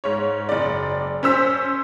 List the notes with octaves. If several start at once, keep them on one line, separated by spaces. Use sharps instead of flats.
G#2 C#5
F#1 D5
C#4 C5 E6 B6